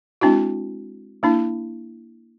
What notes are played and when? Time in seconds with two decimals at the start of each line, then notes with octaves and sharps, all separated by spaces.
0.21 G#3 C4 D4 E4 F#4
1.23 A#3 D4 E4